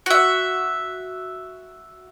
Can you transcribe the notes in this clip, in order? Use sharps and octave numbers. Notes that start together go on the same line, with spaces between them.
F#4 E5